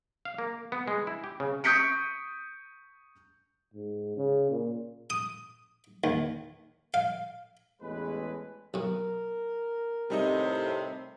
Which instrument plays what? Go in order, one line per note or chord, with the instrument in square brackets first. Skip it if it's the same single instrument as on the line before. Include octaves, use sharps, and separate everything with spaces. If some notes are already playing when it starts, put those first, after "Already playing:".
[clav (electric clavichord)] F5
A#3
B3
G#3
E4
G4
C#3
[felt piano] C#6 D#6 G6 B6 C#7 D7
[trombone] G#2
C#3
A#2
[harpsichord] D#6
D#2
F5
[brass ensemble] A1 E2 G#3 B4
[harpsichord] B1 B2 [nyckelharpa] A#4
[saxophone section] A2 C3 [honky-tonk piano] G3 D#4 D#5